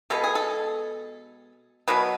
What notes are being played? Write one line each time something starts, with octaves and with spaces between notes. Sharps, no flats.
B2 G#3 B3 A4
G#4
A4
B2 F#3 B3 B4